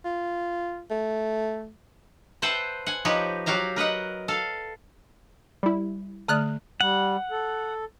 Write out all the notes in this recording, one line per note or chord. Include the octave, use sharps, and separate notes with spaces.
F4
A3
B4 C5 E5 F#5 G5 A5
F#5 G#5
F3 D#4 G4 B4 C#5
F#3 F#4 G4 F5 A#5
A#4 B4 D#5 F#5
A4 F5
G3 E4
D3 A3 D5 D#6 F6 F#6
G3 F#5
A4